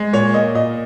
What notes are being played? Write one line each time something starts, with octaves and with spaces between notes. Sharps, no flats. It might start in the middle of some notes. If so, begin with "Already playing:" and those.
Already playing: G#3
A#2 C#5
A#3 D#5
A#2 D#5